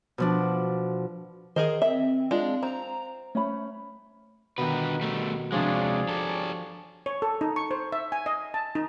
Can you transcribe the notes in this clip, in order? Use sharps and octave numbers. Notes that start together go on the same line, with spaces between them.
B2 F3 D4
D#3 G#4 A#4 C5 D#5
C4 E5
G#3 D4 F4
C4 A#5
A3 C#4 B5
B2 D3 D#3 B4
G3 A3
C3 F3 G#3 D4 G#4 C#5 D5
G4 A4
C#5
A4
D#4
C#6
C5
E5
G#5
D#5
A5
D#4